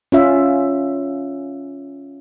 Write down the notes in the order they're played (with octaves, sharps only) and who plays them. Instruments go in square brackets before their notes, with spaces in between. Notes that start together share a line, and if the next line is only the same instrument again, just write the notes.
[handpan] C#4 F4 E5